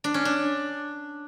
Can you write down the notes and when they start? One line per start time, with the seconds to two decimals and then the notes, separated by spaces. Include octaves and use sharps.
0.04 D4
0.14 C#4
0.25 D4